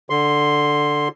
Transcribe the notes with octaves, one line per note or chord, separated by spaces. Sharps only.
D3 C6